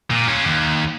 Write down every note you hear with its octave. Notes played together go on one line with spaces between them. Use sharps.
A#2
C#4 F4
D#2